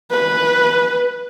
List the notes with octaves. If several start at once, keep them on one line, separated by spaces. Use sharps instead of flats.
B4